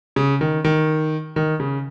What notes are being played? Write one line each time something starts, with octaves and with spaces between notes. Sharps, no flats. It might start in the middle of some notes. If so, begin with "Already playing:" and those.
C#3
D#3
D#3
D#3
C#3